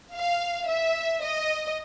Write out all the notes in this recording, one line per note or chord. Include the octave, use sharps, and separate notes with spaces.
F5
E5
D#5